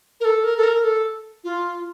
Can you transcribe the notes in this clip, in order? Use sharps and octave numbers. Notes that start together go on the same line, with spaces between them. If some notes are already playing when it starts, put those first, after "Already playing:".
A#4
A4
A#4
A4
A#4
A4
F4